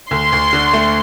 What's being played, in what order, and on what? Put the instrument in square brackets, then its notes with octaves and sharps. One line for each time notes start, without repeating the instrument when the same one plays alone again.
[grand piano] D2 [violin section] C6
[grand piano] D2
D3
A3